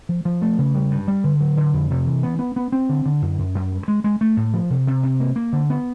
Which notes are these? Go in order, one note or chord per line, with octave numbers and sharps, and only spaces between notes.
F3
F3
A3
C#3
G3
G2
G3
D3
F#3
D3
F2
C3
E3
B3
B3
B3
C4
D3
D3
F#2
F#2
F#2
G2
G#3
G#3
A3
A2
F3
C3
C3
C3
A#3
A#3
D3
B3